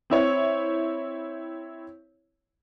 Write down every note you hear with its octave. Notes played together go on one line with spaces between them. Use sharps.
C4 E4 C#5